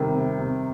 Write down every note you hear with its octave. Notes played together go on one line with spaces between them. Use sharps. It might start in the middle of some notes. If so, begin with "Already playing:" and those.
Already playing: C3 D#3 G3
C3
C3